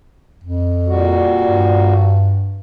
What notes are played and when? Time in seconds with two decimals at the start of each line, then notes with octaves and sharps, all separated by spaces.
0.43 F2
0.87 A#2 G3 F#4
1.43 G2